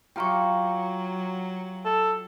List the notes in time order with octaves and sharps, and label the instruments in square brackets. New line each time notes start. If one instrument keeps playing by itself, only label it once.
[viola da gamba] F#3 [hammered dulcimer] F4 G4 [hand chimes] G5 A#5 C#6
[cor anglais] A4